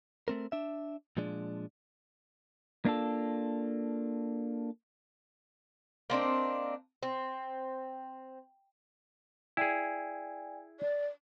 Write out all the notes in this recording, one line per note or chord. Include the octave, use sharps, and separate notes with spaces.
A3 C4 A#4
D4 E5
A#2 F3 G#3 D4
A#3 D4 F4 A4
A#3 C4 D4 D#4
C4
E4 G#4 D5 G5 G#5
D5